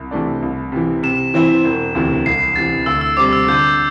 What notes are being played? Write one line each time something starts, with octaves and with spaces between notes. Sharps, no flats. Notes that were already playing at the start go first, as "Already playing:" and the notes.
Already playing: C2
C3 E3 A3 D4
C2
C3 E3
C3 E7
E3 C4 E4 C5
E1
D2 C3 E3
C2 C7
C3 E3 A6
D2 E6
E6
C3 G3 C4 D6
E6
D3 G6